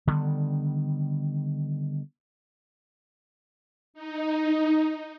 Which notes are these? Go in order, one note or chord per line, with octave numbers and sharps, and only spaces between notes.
D3 D#3 G3 B3
D#4